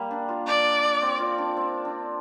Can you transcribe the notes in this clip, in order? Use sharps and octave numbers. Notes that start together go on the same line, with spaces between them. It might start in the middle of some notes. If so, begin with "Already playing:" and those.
Already playing: G3 A#3
D4
F4
D4 D5
C4
F4
D4
C4
D4